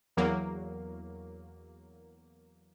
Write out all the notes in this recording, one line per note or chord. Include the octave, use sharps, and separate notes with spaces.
E2 F#3 A#3